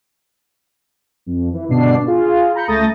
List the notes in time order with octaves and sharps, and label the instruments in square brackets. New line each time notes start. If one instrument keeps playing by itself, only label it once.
[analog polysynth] F2
E3
G1 B2 D4 C7
F4 G#4
A#5 B5 G6 C#7
C#2 A3 D#6 G6 A6 A#6